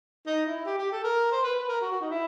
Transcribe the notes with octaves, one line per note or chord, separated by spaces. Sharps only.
D#4
E4
G4
G4
A4
A#4
C5
B4
B4
A#4
F#4
F#4
D#4
E4